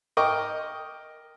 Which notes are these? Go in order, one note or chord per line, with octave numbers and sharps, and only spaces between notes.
A#4 D#5 G5 C#6 D6